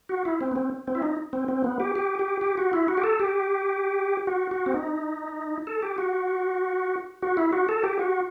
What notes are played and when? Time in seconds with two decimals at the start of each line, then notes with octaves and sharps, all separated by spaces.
0.09 F#4
0.25 E4
0.41 C4
0.51 B3
0.56 C4
0.88 C4
0.95 E4
1.03 D#4
1.33 C4
1.48 C4
1.64 B3
1.80 G4
1.95 G4
2.19 G4
2.41 G4
2.57 F#4
2.73 E4
2.88 F#4
2.97 G4
3.04 A4
3.20 G4
4.27 F#4
4.51 F#4
4.66 C4
4.74 D#4
5.67 A4
5.82 G4
5.98 F#4
7.22 F#4
7.37 E4
7.53 F#4
7.69 A4
7.84 G4
7.99 F#4